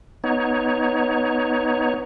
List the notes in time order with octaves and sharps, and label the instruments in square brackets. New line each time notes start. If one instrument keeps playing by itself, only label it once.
[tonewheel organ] B3 D#4 C#5